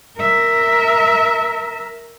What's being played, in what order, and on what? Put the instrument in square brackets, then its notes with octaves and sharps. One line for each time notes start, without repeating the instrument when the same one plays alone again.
[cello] A#4 E5